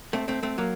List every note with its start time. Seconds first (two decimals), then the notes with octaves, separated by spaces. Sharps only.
0.13 A3 C4
0.28 A3 C4
0.43 A3 C4
0.58 F#3 A#3